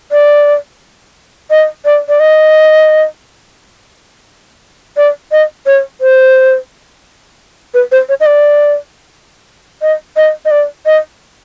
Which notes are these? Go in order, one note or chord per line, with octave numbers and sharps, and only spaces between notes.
D5
D#5
D5
D5
D#5
D5
D#5
C#5
C5
B4
C5
C#5
D#5
D5
D#5
D#5
D#5
D5
D#5